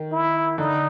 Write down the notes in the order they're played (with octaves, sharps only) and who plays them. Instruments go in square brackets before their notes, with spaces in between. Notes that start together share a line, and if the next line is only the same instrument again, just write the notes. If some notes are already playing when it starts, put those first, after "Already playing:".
Already playing: [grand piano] D#3
[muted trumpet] E4
[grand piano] D3 [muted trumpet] D#4